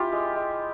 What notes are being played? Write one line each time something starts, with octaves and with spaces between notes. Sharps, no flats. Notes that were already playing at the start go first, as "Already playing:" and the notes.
Already playing: C#4 E4 F4 G4
G#3
G#3